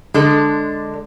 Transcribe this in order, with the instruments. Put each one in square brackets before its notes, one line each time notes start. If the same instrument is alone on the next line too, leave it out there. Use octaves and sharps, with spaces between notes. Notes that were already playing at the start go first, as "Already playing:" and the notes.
[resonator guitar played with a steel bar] D3 G#3 D4 A4